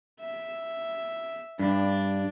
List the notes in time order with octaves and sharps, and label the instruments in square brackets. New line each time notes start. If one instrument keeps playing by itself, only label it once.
[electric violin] E5
[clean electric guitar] G2 [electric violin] D4